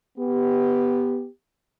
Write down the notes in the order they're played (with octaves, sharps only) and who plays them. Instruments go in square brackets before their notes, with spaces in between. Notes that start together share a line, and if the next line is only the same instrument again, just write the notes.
[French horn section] B3 G4